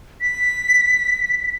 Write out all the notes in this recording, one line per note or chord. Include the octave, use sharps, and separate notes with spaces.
B6